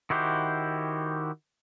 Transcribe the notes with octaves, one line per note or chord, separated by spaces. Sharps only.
D#3 E4 F#4 G4 C5